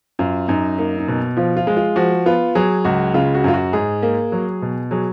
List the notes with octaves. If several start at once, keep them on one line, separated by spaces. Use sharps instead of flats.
F#2 F4
F#2 D#4
A#3 D#4
D#4
B2
F3 F4
F4
G#3
F4
F3 F#4
B3 F4
F#3 G#4
C#2 F#4
C#3 F4
F#4
F#2 F4
F#4
G#2 G#4
A#3
F#3
B2
F#3 G#4